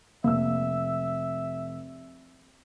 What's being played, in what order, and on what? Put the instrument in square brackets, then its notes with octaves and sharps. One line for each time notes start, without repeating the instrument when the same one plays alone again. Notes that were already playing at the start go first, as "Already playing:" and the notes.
[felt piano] F1 E6 [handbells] A#3 [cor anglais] E5